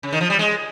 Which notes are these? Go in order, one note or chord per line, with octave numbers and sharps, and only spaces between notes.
C#3
D#3
F3
G3
G#3